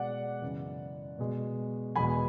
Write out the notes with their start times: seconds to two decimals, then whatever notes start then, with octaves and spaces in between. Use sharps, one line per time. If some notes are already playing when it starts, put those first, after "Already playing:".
Already playing: B2 G#3 D5 F#5
0.42 F#2 C#3 E3
1.19 B2 G#3
1.96 E2 B2 G#3 G#5 B5